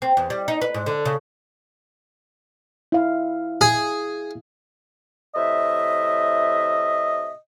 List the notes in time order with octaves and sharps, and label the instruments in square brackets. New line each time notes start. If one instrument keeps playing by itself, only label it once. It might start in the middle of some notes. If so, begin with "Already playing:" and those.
[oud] C4
E2
G3
D#4
B4
G#2
D3
C#3
[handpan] E4 F5
[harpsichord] G#4
[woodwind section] A2 C3 E5 [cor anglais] D#5